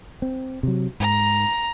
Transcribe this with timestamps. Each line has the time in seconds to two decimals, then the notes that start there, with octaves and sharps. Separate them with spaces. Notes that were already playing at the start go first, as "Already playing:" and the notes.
0.22 C4
0.63 C3 F#3
1.00 G#2 A#5